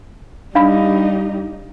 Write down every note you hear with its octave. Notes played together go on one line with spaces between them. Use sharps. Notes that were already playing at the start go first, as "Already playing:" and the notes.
G3 D4 D#4 F5 B5